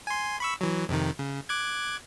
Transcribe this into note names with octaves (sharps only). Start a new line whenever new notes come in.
G#5 C6
B5 C#6 E6
E3 F#3
F2 C3 D#3
C#3
D6 F#6 G#6